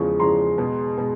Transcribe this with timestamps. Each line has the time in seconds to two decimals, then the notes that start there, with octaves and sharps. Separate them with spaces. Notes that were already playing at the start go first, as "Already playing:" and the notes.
Already playing: E2 C#3 F3 G#3 C#6
0.19 E2 C#3 F3 G#3 A#5 C6
0.58 B2 G#3
0.98 B2 G#3